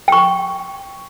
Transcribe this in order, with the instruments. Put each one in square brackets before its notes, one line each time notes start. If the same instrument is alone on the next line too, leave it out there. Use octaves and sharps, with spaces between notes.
[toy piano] G5 C#6